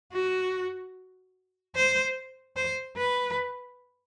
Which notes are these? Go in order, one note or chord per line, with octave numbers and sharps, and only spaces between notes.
F#4
C5
C5
B4